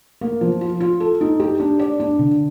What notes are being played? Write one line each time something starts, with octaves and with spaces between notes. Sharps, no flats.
A#3
F3
F4
F4
A4
D#4
G4
D4
D5
D4
D3